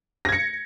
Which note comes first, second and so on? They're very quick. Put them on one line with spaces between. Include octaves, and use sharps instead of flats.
A#6 G#6 C#7